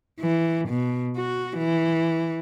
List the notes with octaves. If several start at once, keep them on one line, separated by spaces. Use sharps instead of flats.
E3
B2
F#4
E3